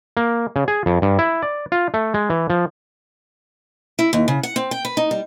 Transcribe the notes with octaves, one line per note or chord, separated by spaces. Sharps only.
A#3
C#3
G#4
F2
G2
E4
D5
F4
A3
G#3
E3
F3
E4
D#2
C#3
F#5
C4
G5
B4
D#4
G3